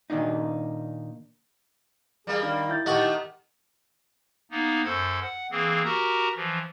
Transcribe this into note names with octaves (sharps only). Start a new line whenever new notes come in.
A#2 D#3 A#3 D4 D#4
G3 A#3 G#4
D#3 D4
E4 G6 A6
D#3 A3 G4 D#5 F#5 C#6
A#3 B3 D#4
F#2 A4 C5 G#6
F#5
E3 A#3 C4 G#4
F#4 G4 A#4 A#5
E3 F3